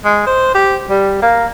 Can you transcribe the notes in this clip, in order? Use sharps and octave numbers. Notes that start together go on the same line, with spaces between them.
G#3
C5
G4
G3
A#3